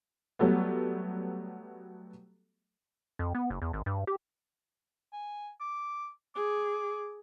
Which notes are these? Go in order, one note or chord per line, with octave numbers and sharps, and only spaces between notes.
F#3 G3 A3 B3
F2
B3
F#1
E2
G#1
G2
G4
G#5
D6
G#4 D6